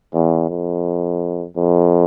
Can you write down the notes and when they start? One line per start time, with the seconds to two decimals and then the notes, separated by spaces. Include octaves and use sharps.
0.14 E2
0.50 F2
1.57 F2